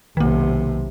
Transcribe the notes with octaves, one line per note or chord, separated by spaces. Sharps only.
B1 C3 D#3 A#3